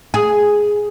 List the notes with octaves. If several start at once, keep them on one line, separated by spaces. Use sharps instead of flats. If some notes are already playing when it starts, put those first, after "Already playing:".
G#4